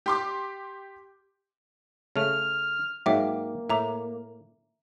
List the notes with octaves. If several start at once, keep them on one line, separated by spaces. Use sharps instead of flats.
G4 C6 D6
C#3 A3 F6
G#2 F#3 A#3 E5 G5 D6
A2 E5 A#5 D6